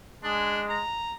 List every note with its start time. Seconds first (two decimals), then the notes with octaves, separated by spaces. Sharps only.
0.23 G#3 D4
0.69 A#5